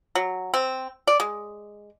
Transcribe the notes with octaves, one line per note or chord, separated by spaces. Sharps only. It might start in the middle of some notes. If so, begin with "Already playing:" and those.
F#3
C4
D5
G#3